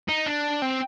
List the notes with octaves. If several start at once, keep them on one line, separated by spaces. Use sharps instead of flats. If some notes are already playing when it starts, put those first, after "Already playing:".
D#4
D4
C4